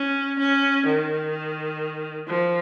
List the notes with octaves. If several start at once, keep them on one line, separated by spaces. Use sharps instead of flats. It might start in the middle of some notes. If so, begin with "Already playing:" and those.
Already playing: C#4
C#4
D#3
F3